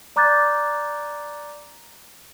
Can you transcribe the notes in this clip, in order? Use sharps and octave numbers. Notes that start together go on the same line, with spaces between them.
D5 A#5 D6 F#6 G6 A6